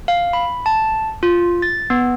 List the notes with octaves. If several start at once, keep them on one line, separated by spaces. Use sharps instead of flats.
F5
B5
A5
F4
A6
B3